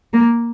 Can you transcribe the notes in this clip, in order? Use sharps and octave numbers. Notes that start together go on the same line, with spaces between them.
A#3